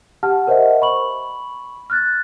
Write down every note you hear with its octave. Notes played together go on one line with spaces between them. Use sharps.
G4 F#5 A5 F6
A#4 C5 C#5 D#5 E5 F#5
B5 C#6 F#7
F6 F#6 A6